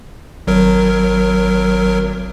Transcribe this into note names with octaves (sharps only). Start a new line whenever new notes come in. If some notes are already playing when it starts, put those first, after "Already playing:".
G#1 F#3 A#4